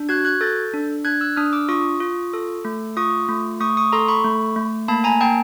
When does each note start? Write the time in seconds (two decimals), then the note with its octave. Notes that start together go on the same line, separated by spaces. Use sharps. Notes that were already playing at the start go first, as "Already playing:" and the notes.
Already playing: D4
0.09 F#4 F#6 G#6
0.25 F#6 G#6
0.41 A4 G6 A6
0.74 D4
1.05 D4 F#6 G#6
1.21 E6 F#6
1.36 D4 D#6 F6
1.53 D6 E6
1.69 F4 C#6 D#6
2.00 F4
2.33 A4
2.65 A3
2.97 F4 C#6 D#6
3.29 A3
3.61 A3 C#6 D#6
3.77 C#6 D#6
3.92 A4 A#5 C6
4.08 B5 C#6
4.24 A3
4.56 A3
4.88 A#3 A5 B5
5.04 G#5 A#5
5.20 A#3 G5 A5